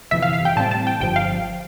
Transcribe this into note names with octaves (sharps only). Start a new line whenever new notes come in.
G1 F2 C3 E3 E5
F5
F5
G5
A2 G3 C4 A5
A5
G5
G1 G2 F3 G5
F5